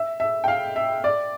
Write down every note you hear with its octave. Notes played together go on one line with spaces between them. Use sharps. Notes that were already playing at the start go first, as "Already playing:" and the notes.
Already playing: E5
E5
G5
F5
E5
D5